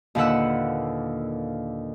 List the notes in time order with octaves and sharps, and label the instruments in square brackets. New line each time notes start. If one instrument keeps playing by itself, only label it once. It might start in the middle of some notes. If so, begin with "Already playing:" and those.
[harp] D#2 A#2 D3 B4 F#5 E6